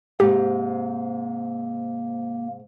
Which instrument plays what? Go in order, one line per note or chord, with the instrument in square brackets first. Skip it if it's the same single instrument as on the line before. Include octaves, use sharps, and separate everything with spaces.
[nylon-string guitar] G#2 C3 [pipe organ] A#3 [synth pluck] G4